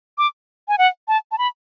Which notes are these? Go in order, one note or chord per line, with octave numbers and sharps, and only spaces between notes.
D6
G#5
F#5
A5
A5
B5